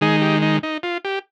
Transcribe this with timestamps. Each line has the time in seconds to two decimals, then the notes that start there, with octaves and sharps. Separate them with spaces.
0.01 D#3 G#3 D#4 G#4
0.22 G4
0.42 D#4
0.63 D#4
0.83 F4
1.05 G4